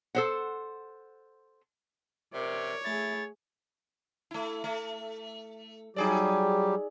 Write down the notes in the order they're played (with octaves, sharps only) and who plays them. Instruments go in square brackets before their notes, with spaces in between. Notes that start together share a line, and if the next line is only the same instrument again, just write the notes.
[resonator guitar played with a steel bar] A4 C5 F#5
[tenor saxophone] C3 [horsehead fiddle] A#4 D5 [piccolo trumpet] C#5
[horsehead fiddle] A3 G#4 [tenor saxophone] E4 [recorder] A6
[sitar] A3 E4
A3
[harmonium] F#3 G3 G4 [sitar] D#4 G#4 D5